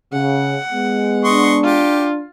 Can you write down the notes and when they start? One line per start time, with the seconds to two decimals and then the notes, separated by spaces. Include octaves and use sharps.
0.13 C#3 F#5
0.72 G#3 B3
1.24 D4 D#5 C6 C#6
1.63 F4 G4